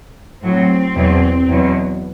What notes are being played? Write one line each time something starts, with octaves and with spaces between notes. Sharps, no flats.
A2 F#3 C4
E2 B2 F#3
E2 B2 F#3